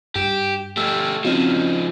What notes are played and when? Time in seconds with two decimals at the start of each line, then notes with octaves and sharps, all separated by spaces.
0.16 G2 G4 D7 E7
0.77 A3 G4 E6 F6 G#6
1.25 F3 C4 C#4 D#4 F#4